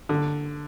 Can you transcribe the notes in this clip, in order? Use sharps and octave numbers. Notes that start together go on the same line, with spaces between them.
D3